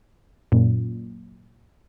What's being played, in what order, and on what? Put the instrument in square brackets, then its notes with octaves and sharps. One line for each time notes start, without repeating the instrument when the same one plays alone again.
[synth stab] F#2 A#2